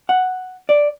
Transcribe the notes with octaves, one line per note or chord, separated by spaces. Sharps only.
F#5
D5